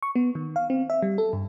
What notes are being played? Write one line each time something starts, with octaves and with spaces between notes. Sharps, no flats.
C#6
B3
D#3
F5
C4
E5
G3
A4
G2